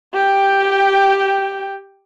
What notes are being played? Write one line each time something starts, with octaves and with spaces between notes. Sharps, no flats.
G4 G5